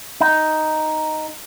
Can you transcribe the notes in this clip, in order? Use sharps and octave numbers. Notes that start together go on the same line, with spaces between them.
D#4